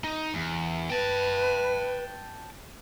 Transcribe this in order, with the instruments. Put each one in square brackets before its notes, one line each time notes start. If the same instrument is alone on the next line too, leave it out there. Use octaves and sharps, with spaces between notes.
[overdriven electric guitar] D#4
E2
[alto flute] B4 [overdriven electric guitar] G5 A5